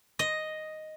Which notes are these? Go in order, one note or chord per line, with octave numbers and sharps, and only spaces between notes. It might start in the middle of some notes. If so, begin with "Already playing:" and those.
D#5